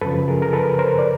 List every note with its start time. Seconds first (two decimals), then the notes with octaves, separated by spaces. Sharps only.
0.01 F#2 C#3 F3 A4 B4
0.28 G#4 A#4
0.42 A#4
0.53 A4 B4
0.79 A#4 C5
0.99 D5